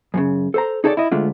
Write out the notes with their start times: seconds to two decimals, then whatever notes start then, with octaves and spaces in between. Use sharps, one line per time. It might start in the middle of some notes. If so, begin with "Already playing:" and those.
0.14 F#2 A#2 C#3
0.54 A4 C5 A#5
0.84 D#4 G#4 A4 C#5 D5
0.97 E4 D#5
1.11 D2 G#3 A3 D4 F4